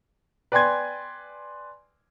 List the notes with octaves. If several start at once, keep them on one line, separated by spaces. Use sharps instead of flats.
B4 D5 G5 G#5 C6 G#6